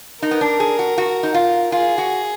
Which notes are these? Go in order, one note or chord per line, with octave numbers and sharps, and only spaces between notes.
D#4 A#4
B3
D4
G#4
F#4
F#4
D#4
F4
F4 G#4
F#4